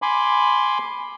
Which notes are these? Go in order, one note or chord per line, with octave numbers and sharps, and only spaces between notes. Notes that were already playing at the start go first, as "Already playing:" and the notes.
G#5 B5 C6 D6